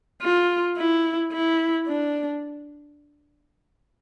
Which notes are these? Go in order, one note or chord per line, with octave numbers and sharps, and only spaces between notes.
F4
E4
E4
D4